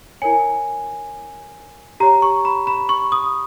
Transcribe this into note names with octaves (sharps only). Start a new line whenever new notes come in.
E4 A#4 C#5 G#5
G4 C#5 A#5
C#6
B5
B5
C#6
D#6